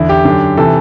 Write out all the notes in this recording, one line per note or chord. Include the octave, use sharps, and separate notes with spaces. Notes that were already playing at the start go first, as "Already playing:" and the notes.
Already playing: E2 D3 E4
G4
F#2 D3
C3 E3 A4